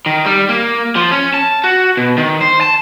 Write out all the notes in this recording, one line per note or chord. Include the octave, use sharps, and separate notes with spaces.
D#3
G3
A#3
F3
C#4
A5
F#4
B2
D#3
C5
A5